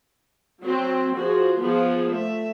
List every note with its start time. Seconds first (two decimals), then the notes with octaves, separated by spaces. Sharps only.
0.62 F#3 C4
1.16 F3 F#4 G#4 C5
1.59 F3 B3 G#4
2.10 A3 E5